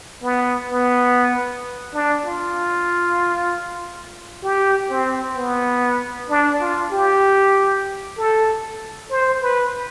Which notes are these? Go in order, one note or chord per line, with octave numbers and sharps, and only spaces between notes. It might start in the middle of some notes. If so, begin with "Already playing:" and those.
B3
B3
D4
F4
G4
C4
B3
D4
F4
G4
A4
C5
B4